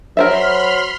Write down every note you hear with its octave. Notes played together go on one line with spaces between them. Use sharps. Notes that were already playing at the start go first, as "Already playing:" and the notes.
F#3 A#4 C5 E5 B5 C6 F6